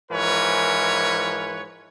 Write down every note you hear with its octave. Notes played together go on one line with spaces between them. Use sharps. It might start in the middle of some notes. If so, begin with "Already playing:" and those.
G#2 E3 F3 A#4 B4 C#5